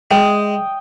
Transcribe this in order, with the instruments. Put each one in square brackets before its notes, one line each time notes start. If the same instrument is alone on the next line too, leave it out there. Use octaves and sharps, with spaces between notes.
[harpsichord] G#3 [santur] G5 D#6